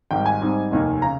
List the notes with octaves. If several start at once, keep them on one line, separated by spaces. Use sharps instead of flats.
G#1 G#2 G3 G5
G#5
G#2 G3 C4 D#4
F1 D#2 D#3 A#3
C#3 A#5